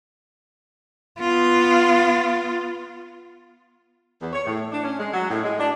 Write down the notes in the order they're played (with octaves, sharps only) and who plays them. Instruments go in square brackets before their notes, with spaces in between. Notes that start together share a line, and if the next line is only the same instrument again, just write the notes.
[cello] B3 F4
[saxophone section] E2
C#5
A2
D4
C#4
G#3
F#3
A2
G#3
D4